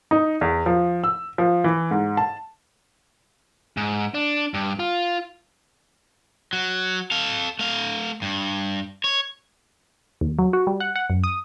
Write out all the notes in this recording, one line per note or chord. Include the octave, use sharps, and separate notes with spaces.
D#4
E2
F3
E6
F3
E3
G#2
A5
G#2
D4
G2
F4
F#3
A4 F5
A3 F5
G2
C#5
D#2
F#3
F#4
G3
F#5
F#5
F#2
D#6